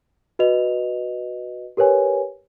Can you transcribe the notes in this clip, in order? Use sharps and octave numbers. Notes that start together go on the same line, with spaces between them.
F#4 B4 D#5 F7
G4 A#4 B4 C#5 G#5